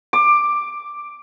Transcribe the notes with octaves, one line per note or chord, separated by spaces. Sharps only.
D6